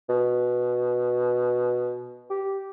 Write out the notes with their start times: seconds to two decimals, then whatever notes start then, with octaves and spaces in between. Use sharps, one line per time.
0.09 B2
2.30 G4